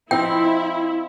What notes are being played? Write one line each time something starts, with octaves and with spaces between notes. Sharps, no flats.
F3 C4 D#4 E4 G5